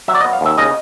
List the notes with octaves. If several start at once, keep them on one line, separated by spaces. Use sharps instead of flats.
F#3 E5
D5
D#5
B3
F5
D#2 E5
C#3 D#5